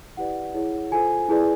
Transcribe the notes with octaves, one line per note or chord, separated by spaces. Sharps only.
E4 G4 B4 D5 F#5
E4 G#4 C#5
F4 A4 C5 G#5
E4 G#4 B4 D5